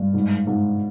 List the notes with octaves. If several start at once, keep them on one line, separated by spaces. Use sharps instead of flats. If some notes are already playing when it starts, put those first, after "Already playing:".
Already playing: G2
G#2
G#2